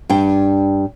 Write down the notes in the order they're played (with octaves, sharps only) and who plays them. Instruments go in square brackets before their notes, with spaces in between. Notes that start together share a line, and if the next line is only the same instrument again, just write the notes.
[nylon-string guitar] G2 D4 G5